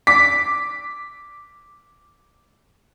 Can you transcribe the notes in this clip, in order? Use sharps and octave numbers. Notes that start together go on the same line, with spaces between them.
D6 B6